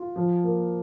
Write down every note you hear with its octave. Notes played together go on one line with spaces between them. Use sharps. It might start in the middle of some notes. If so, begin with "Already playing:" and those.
Already playing: F4
F3
A#3